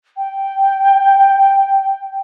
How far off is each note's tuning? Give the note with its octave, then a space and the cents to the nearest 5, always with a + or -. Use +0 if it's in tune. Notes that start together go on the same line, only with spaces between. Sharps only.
G5 -10